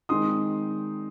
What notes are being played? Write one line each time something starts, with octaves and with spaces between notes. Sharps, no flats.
D#3 G#3 C4 D#4 C6 D#6